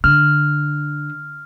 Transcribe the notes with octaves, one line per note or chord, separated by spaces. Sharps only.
D3 F6